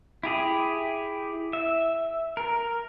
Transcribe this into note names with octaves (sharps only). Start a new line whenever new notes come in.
E4 G4 G#4
E5
A#4